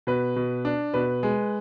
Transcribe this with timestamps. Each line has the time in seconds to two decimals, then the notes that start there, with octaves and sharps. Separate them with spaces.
0.07 B2 B4
0.36 B2
0.65 D4
0.94 B2 B4
1.23 G#3